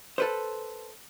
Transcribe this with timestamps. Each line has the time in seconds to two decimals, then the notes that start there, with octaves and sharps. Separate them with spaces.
0.18 A4 B4 C5